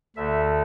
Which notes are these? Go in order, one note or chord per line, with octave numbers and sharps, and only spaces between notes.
D2 D3 A3 E5